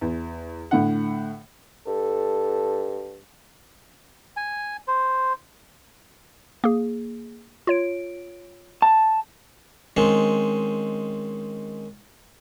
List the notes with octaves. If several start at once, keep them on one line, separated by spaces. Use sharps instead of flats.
E2
A2 D3 F#5
G2 A4
G#5
C5
A#3 G#4
F4 C#5 D7
A5
D#3 G#3 C4 C#4